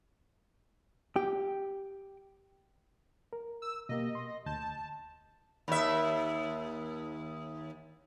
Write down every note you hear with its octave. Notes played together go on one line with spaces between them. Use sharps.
G4
A#4
E6
B2 A#3 G4 D#5
C6
D2 A5 G6
D#2 E5